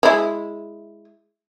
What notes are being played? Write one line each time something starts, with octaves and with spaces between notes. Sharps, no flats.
G#3 E4